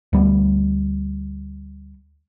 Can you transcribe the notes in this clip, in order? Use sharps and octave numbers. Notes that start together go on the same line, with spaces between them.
D2 G3 B3